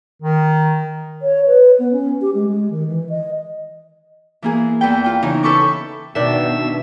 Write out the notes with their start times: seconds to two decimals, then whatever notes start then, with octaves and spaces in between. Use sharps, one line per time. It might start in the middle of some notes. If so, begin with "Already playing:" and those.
0.23 D#3
1.22 C#5
1.46 B4
1.79 B3
1.92 C#4
2.21 G4
2.34 G#3
2.48 G#3
2.70 D#3
2.88 E3
3.09 D#5
4.42 E3 A#3 G#4
4.81 E2 B4 G5
5.04 F4 G5
5.23 C#3 E3 D#4
5.43 A4 B4 C#6 D6 G6
6.15 B2 D#3 D4 E5